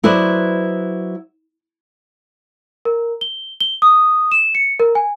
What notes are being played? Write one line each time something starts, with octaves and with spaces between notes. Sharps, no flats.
F#3 E4 B4 C5 D5 D#5
A#4
G7
G7
D#6
E7
C#7
A#4
G#5